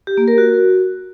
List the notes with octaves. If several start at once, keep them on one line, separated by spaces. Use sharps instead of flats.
G4
A#3
A#4
F#4